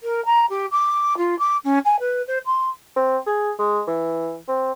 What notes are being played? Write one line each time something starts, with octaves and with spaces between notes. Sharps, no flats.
A#4
A#5
G4
D6
F4
D6
C#4
G#5
B4
C5
C6
C4
G#4
G#3
E3
C4